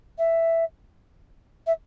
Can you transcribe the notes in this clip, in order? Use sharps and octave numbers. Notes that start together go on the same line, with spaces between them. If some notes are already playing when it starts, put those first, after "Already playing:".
E5
E5